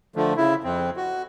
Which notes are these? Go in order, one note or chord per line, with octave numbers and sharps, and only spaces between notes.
D3 F3 A3
C#3 E4
F2 C4
F#4